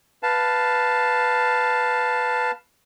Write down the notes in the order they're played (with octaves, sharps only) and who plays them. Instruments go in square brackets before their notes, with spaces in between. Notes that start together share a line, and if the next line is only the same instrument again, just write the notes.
[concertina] B4 F5 A5